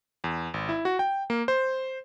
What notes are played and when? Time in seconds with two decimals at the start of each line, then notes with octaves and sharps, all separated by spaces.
0.24 E2
0.54 G#1
0.69 E4
0.85 F#4
0.99 G5
1.30 A#3
1.48 C5